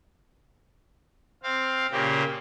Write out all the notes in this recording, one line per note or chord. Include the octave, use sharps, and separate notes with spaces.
C4 F5
A#2 C#3 A#3 G4